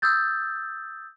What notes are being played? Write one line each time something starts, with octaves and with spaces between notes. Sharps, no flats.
D#6 E6 G6 A6